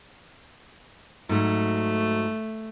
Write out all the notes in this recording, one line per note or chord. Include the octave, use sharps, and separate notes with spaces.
G#2 F#3 A3